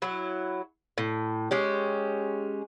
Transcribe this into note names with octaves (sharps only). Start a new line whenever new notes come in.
F#3 E4
A2
G#3 C#4 G4